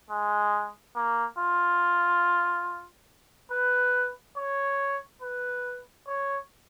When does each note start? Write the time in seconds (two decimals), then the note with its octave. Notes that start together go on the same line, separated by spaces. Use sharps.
0.11 G#3
0.96 A#3
1.38 F4
3.51 B4
4.37 C#5
5.22 B4
6.08 C#5